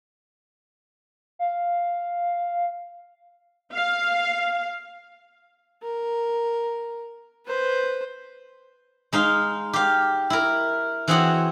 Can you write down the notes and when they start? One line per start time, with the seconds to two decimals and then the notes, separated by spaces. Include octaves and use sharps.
1.39 F5
3.73 F5
5.83 A#4
7.46 B4 C5
9.13 G#3 D#4 F5
9.73 G4 F5
10.30 E4 A#4
11.08 E3 C4 F#4 G#4 C#5 F#5